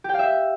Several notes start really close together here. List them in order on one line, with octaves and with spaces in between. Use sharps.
G4 G5 F5 E5